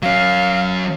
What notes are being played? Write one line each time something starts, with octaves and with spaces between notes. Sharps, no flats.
F#3 C#4 F5